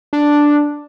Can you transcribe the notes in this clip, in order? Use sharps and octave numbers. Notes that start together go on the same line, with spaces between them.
D4